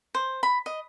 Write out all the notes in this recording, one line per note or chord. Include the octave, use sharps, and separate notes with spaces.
C5
B5
D#5